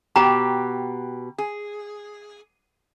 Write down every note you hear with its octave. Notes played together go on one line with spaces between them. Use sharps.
B2 G4 G5 A#5
G#4